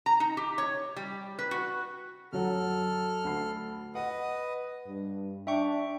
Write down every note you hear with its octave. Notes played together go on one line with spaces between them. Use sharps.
A#5
D#4
G4
C#5
G3
B4
F#4
F#2 F#3 A4 F#5 F6
D2 B5 C7
B4 D#5 F#5 D#6
G2
D4 E5 G5 C#6